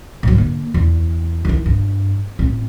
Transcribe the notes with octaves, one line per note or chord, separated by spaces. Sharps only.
G#2 F#3
D3 A#3
E2
D#3 E3
G2
A1 C4